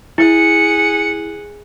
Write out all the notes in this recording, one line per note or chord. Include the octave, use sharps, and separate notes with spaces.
E4 G#4 F#5 C#7